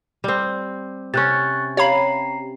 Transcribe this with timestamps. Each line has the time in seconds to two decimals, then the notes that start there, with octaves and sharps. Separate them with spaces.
0.24 G3 C4
1.14 C3 C#4 C#6 F#6 A6
1.77 G4 C#5 F5 A#5 B5 C7